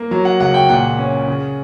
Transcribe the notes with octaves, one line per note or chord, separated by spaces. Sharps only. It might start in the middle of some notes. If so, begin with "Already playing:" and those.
Already playing: A#3
F#3 A#5
F#5
C#2 F#5
G5
A#2 F#5
C#4
C#3